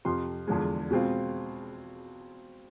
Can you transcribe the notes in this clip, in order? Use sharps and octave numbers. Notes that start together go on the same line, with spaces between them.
F2 C3 F3 C6
E2 D3 F3 G#3
B2 G#3 C4 F4